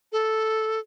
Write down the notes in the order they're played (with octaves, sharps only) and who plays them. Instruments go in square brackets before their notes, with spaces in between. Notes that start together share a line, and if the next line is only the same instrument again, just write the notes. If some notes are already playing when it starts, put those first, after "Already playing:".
[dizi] A4